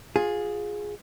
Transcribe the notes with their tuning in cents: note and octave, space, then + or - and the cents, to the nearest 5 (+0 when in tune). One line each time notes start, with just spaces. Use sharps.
F4 +25 G#4 +0